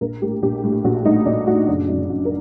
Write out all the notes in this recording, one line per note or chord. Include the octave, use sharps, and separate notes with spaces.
A#1 A#4
A2 G4
A#1 G4
A2
A#1 F#4
A2 D#4
A#1 D4
A2 F#4
F#1 D4
F#2 D3 D#4
F#1 F#4
A#4